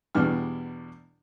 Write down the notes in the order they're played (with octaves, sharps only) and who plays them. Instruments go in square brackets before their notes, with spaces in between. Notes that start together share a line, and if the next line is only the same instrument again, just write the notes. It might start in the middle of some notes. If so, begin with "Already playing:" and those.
[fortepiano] E2 B2 E3 G3 D4 F6